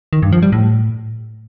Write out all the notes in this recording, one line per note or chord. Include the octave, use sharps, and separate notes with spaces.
D#3
G2
F3
G3
A2